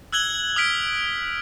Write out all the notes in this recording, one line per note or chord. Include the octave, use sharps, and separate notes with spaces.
E6 F#6 G#6 F#7 G7
D#6 F6 B6 D7